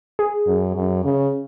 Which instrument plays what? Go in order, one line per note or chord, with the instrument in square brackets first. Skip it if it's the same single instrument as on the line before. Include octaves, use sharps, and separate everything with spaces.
[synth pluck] G#4
[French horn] F#2
F#2
C#3